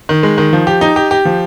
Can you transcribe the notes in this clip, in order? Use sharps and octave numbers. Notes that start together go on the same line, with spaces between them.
D#3
G#3
D#3
F3
G4
D#4
G4
G4
F3